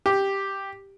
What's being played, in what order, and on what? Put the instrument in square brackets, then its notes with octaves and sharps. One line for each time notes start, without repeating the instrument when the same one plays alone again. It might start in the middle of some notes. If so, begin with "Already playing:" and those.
[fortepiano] G4